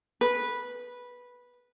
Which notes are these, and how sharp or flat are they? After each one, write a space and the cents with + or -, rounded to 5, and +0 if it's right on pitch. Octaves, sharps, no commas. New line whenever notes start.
B4 -10